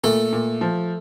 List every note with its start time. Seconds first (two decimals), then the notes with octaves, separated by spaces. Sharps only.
0.04 A#2 A3
0.33 A#2
0.61 F3